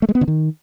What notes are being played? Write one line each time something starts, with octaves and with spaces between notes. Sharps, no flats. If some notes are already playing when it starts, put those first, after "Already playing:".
A3
G#3
B3
D3
D#3